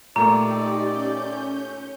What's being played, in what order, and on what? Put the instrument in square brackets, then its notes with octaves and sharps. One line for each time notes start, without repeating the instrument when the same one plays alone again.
[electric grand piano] A#2 A3 A#3 [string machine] D#4 G4 [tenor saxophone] D5 [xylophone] A#5
[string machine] C#4 G6